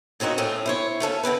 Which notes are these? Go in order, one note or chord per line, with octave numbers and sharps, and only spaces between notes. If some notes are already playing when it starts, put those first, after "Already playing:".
A#2 C#3 C4 D#4 F#4
A2 A3 C4 C#4 F4
E4 C5 C#5
A3 C#4 A4 F5
D3 C4 E4 B4